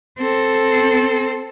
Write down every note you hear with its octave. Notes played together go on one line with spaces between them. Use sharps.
C4 A4